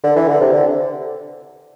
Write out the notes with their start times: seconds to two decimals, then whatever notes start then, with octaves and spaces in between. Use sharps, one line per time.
0.04 D3
0.16 E3
0.28 D3
0.41 C3
0.53 D3